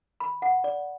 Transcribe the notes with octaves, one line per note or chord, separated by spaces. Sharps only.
B5
F#5
D5